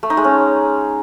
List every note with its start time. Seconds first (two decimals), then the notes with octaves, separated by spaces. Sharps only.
0.03 A3
0.10 D#4
0.17 G#3
0.24 C#4